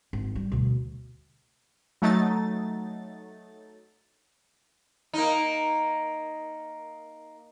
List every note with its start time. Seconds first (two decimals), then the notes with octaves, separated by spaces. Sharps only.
0.13 G#1
0.36 G3
0.52 D2 B2
2.02 F#3 A3 D#4 A6
5.14 A#3 D#4